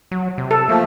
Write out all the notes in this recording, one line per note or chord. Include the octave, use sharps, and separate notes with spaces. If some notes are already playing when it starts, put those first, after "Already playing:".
F#3
C3
A4
F3 A3 A#3